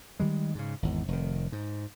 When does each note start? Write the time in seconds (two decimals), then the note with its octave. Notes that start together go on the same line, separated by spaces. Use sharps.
0.20 D#3 G3 G#3
0.55 G#2 C#3
0.83 G#1 E2
1.08 F1 D#3
1.52 G#2